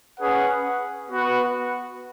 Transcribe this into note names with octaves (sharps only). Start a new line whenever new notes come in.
C#4 G#4 B4 F#5
B3 F#4 B4 F#5